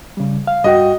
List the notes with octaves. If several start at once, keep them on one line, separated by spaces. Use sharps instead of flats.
C#3 G3
F5
G2 F#4 D#5 G5